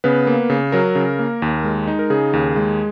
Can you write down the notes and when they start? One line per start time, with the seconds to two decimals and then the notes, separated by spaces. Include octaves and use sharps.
0.04 C#3 B3 B4
0.27 A#3
0.50 C#3
0.72 F#3 A#4
0.95 C#3
1.19 A#3
1.42 D#2
1.64 G#3
1.88 D#4
1.99 A#4
2.10 C#3 G#4
2.33 D#2
2.56 G#3